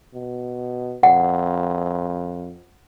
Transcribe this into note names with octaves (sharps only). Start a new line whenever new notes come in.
B2
F2 F#5